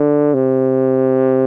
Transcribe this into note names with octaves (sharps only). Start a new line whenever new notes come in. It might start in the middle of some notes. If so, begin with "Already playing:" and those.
Already playing: D3
C3